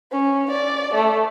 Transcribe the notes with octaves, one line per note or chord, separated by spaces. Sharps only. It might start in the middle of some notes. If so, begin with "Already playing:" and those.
C#4
D5
A3